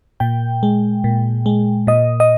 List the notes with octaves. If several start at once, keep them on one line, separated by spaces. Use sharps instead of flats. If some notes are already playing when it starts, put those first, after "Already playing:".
A#2 G5
G#3
A#2
G#3
A#2 D#5
D#5